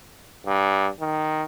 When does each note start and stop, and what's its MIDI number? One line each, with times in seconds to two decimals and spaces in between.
0.46 0.88 43
1.00 1.43 51